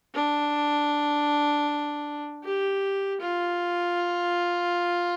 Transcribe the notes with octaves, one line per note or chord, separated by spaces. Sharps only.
D4
G4
F4